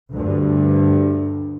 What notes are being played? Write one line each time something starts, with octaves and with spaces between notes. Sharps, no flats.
D2 G2 D3